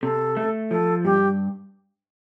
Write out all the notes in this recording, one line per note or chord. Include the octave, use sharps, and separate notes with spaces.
C3 A4
A3
F3 A4
G2 G4